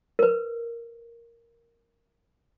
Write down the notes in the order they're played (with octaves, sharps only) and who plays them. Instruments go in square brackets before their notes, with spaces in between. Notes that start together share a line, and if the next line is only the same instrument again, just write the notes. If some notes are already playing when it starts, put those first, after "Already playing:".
[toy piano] A#4 B4